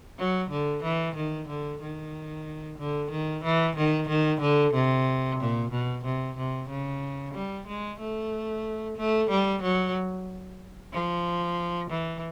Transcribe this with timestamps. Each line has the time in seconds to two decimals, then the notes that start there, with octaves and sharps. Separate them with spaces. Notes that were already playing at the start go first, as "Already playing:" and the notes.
0.18 F#3
0.50 D3
0.84 E3
1.16 D#3
1.48 D3
1.81 D#3
2.79 D3
3.11 D#3
3.44 E3
3.76 D#3
4.09 D#3
4.41 D3
4.74 C3
5.40 A#2
5.72 B2
6.04 C3
6.37 C3
6.69 C#3
7.34 G3
7.67 G#3
8.00 A3
8.97 A3
9.30 G3
9.62 F#3
10.93 F3
11.90 E3